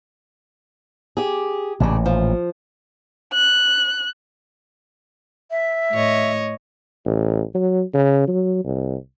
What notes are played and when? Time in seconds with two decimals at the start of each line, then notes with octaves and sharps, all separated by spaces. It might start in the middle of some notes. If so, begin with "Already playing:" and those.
1.17 G4 G#4
1.80 A1 A#2 C#3 D4
2.06 F3
3.32 F#6
5.51 E5
5.92 A2 C#5 D#5
7.06 A1
7.55 F#3
7.94 C#3
8.28 F#3
8.65 C2